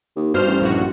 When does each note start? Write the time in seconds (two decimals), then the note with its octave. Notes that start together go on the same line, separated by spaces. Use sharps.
0.16 D#2
0.34 G2 B2 C5 F6
0.46 A1
0.61 A#1 G2 F#4